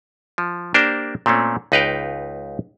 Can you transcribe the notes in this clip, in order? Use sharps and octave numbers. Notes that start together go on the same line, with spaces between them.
F3
A#3 D4 G4 A#4 C5
A#2 A3 C4 C#4
C#2 D#4 B4 D#5 F5 G5